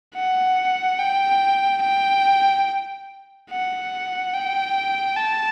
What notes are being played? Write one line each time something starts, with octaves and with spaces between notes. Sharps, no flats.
F#5
G5
G5
F#5
G5
A5